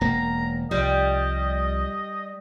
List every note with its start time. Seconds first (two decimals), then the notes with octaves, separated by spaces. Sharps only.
0.01 E1 A#3 A#5
0.71 C2 F3 G3 D#5